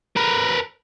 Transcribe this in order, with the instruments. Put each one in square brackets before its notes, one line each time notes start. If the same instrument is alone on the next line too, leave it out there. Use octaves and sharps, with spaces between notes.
[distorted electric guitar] A#4 B4